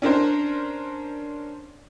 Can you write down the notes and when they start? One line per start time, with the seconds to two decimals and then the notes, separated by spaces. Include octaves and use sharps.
0.02 C#4 D4 A#4 C5